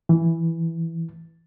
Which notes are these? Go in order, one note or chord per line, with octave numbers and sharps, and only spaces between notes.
E3